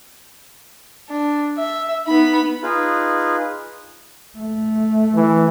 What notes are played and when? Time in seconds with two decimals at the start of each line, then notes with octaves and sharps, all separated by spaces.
1.09 D4
1.58 E5
2.07 B3 D#4 B5
2.63 D#4 F4 G#4 B4
4.38 A3
5.15 E3